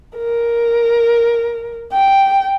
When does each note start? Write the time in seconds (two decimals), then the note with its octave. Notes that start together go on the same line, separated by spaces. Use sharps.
0.17 A#4
1.93 G5